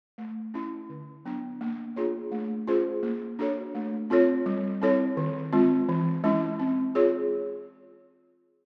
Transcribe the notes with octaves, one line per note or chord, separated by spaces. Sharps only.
A3
C#4 E4
D3
F#3 B3 D4
A#3
D4 F4 G#4 C#5
A3
C#4 F4 G#4 C5
A#3
D4 F#4 A4 C#5
A3
C4 F4 A4 C#5
G3
C4 E4 A4 C#5
D#3
G#3 C4 F4
E3
G#3 C#4 E4
C4
F4 G#4 C#5